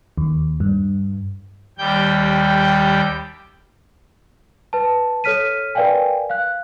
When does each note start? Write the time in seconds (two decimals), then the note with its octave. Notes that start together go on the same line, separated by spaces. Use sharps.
0.18 D#2
0.60 G2
1.78 D#2 G3 G5 G6
4.73 B4 A5
5.24 A4 C#5 F6 B6 D#7
5.75 A#4 B4 D5 F5 G5 G#5
6.30 F5 F#6